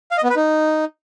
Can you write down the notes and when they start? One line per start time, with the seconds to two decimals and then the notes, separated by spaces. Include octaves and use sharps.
0.11 F5
0.17 D#5
0.24 B3
0.30 B4
0.36 D#4